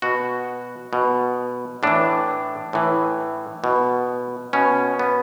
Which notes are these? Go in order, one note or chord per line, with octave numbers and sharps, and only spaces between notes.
B2 F#4
B2
A2 E3 D4
A2 E3
B2
B2 C#4
B3